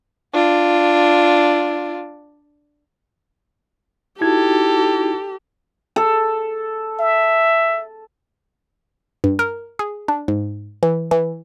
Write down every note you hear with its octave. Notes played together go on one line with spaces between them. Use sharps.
D4 F4
D#4 E4 F#4 G4 A4 G#6
A4
E5
G2
A#4
G#4
D4
G#2
E3
E3